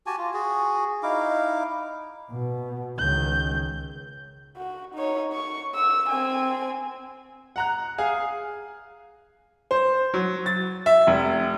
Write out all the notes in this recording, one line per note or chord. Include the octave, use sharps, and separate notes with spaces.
F#4 G4 G#5 A5
F4
F#4 G#4
D#4 E4 F5 D6
B2
C#2 D#3 G6
F#4
D#4 C#5
C#6
E6
C4 G#5
F#5 A#5 F#6
G#4 F5 G#5
C5
F#3
A6
E5
F1